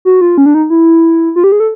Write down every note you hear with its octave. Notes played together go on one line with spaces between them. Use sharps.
F#4
F4
C#4
D4
D#4
E4
F4
G4
G#4
A4